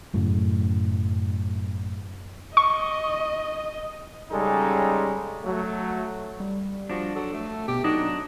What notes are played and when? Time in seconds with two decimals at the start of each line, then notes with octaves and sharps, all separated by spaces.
0.14 F#2 A2 C#3 F#3
2.57 D#5 C#6
4.31 C#3 G3 G#3 C#4 D#4 A4
5.44 F#3 A3
6.40 G3
6.90 F3 D4 F#4
7.16 F#3 A4
7.33 A3
7.68 B2 G4
7.84 F#3 D4 D#4 F#4 D#5